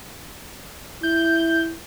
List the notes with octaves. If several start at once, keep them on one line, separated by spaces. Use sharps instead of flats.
E4 G6